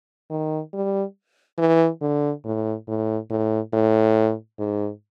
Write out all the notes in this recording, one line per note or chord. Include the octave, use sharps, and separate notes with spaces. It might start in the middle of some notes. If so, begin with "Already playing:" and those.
D#3
G3
E3
D3
A2
A2
A2
A2
G#2